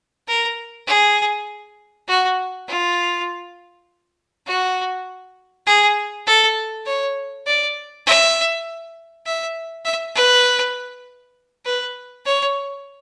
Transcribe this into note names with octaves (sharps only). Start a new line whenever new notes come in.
A#4
G#4
F#4
F4
F#4
G#4
A4
C#5
D5
E5
E5
E5
B4
B4
C#5